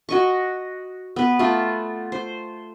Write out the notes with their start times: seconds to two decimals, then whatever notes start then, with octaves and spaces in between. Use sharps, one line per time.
0.09 F#4 D#5 C#6
1.16 B3 B4
1.39 A3 F4 A4
2.12 C5